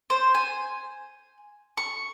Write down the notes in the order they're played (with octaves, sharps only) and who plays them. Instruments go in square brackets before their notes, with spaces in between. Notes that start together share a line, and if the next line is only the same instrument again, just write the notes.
[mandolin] C5
G#5
C#6